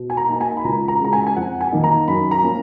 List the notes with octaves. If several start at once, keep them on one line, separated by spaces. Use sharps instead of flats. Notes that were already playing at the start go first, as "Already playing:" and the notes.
Already playing: B2
G#5
A#5
A#3 D#4 A#5
G#5
B5
C#2 A#5
A#5
C#3 G#3 A#5
G#5
G#5
F2 F#5
G#5
D#3 A#3 D#4
A#5
F#2 B5
A#5
F3 A#3 C#4